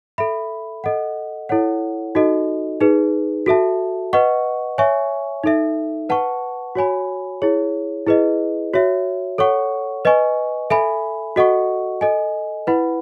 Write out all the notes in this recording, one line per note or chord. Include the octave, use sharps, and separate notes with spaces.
A4 E5 B5
A4 D#5 F#5
E4 A4 C#5 F#5
D#4 F#4 A4 D#5
D#4 G#4 B4
F#4 A4 E5 A5
B4 D#5 F#5 C#6
C#5 E5 G#5 C#6
D#4 A4 E5
B4 F#5 A5 C#6
F#4 C#5 G#5 B5
E4 G#4 C#5
E4 G#4 B4 D#5
F#4 C#5 E5
A4 C#5 F#5 C#6
B4 D#5 G#5 C#6
A4 E5 G#5 B5
F#4 A4 D#5 F#5 C#6
A4 D#5 G#5
E4 B4 F#5 B5